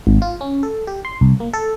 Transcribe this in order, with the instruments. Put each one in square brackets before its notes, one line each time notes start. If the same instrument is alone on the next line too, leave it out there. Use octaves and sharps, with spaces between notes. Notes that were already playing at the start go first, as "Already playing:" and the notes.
[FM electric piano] G#1
F4
C#4
A4
G4
C6
C2
A#3
A4